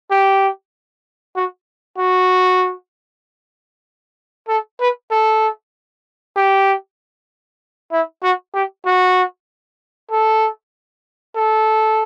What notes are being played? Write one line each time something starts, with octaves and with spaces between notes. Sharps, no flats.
G4
F#4
F#4
A4
B4
A4
G4
E4
F#4
G4
F#4
A4
A4